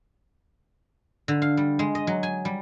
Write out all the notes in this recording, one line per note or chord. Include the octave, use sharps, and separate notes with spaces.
D3
F5
G3
G#3
D#5
F#3
G#5
G3